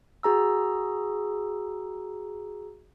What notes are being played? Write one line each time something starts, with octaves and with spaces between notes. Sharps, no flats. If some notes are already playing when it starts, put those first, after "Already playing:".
F#4 G#4 A#5 E6